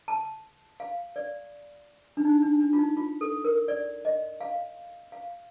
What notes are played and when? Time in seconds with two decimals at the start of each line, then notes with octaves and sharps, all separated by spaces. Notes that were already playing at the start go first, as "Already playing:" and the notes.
0.08 A5
0.80 F5
1.16 D5
2.17 D4
2.25 D#4
2.42 D4
2.60 D4
2.73 F4
2.78 D#4
2.97 F4
3.21 A4
3.44 A#4
3.68 D5
4.05 D#5
4.41 F5
5.12 F5